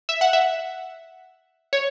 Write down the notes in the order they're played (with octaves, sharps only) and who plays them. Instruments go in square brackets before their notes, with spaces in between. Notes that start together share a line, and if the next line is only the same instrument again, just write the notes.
[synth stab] E5
F#5
E5
C#5